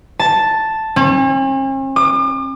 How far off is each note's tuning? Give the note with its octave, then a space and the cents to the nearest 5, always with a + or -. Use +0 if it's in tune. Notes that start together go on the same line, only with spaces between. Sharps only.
A5 +0
C#4 -45
D6 +45